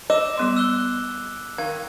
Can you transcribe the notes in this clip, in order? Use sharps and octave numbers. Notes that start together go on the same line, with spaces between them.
D#5 D6 E6 E7
G3 B3 C6
E6 F#6 G7
D#3 F5 G#6